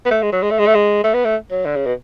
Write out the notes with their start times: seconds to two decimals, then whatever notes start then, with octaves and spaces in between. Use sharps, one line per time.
0.05 B3
0.11 A3
0.23 G#3
0.33 F#3
0.42 G#3
0.51 A3
0.59 G#3
0.67 A3
0.75 G#3
1.04 A3
1.14 B3
1.25 A3
1.51 F#3
1.65 D3
1.76 C#3
1.86 B2